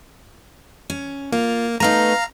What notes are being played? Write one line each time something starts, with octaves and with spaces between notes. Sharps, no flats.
C#4
A#3 F4
A3 B3 D#4 F5 A#5